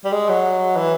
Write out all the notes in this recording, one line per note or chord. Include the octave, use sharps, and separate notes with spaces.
G3
G#3
F#3
E3